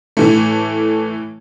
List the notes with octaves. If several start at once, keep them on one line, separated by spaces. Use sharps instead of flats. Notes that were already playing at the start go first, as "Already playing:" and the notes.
A2 E3 A3